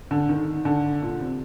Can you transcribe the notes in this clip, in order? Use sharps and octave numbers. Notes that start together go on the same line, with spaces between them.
D3
D#3
D3
A#2
C3